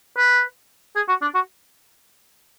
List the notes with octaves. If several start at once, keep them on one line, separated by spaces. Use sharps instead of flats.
B4
G#4
F#4
D4
F#4